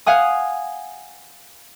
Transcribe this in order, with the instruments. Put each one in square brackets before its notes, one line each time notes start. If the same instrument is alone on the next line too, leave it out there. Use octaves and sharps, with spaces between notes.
[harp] F5 F#5 G#5 D#6